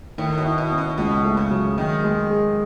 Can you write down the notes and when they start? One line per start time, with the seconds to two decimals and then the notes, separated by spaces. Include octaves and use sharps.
0.18 A2 D#3
0.38 B2
0.45 E4
0.58 B2
0.71 C#4
0.78 B2
0.98 C#2 B2
1.24 A3
1.37 C#3
1.51 F#3
1.77 D#3 G#3
2.04 G#3
2.30 G#4